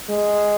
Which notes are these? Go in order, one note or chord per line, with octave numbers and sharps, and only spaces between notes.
G#3